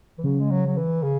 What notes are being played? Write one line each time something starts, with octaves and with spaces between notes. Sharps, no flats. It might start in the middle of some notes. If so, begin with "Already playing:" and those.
E3
C#3 F#3
G#3
F#3
F#3
E3
C#3